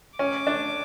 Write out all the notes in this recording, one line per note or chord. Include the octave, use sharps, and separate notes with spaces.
C#4 D6
D4